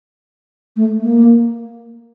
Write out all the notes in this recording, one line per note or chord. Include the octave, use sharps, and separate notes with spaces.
A3
A#3